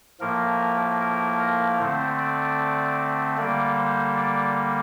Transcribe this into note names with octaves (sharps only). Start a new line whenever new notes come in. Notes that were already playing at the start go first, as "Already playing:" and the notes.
A2 F3 A#3 A#4
A#4
A#4
D3 A3 C4 C5
D5
D3 G3 A#3 D5
C5
D5